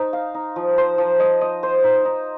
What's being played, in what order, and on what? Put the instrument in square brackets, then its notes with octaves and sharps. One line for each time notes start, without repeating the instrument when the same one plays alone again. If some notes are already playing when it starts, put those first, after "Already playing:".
Already playing: [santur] D#4 C5
F5
D#4
F3
C5
F3
D#5
D#5
C5
D#4
D#4